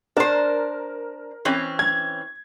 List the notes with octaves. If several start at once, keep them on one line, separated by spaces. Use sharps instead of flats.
D4 A#4 C5
E3 C4 C#4
G#6